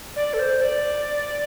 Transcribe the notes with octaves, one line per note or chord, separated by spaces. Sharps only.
D5
A4
C5
D5